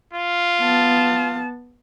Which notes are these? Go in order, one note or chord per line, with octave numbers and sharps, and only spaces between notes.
F4
B3 A5